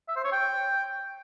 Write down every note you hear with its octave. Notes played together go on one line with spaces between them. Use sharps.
E5
C5
C#5
G5